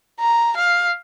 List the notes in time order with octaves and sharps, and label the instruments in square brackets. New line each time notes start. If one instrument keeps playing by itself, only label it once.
[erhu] A#5
F5